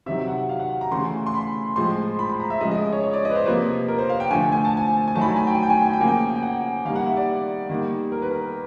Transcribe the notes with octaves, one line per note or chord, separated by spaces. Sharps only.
C3 D#3 F#3 E5
F#5
F5
F#5
A#5
C#3 E3 A3 C6
C6
B5
A2 F3 G#3 C6
B5
B5
A#5
E5
C#3 F3 G#3 D#5
D#5
C#5
C#5
D5
D#5
B4
C5
C3 F3 A#3 B4
A#4
C5
F5
G5
D3 F3 A3 G#5
G#5
A5
G#5
G#5
D#3 F#3 A3 A5
B5
A#5
G#5
G5
G#5
G5
G#5
G5
G#5
G5
C#3 F3 A#3 G#5
G5
G5
F#5
D#3 G3 A#3 F5
F#5
E5
D5
D#3 G3 A#3
A#4
B4
A#4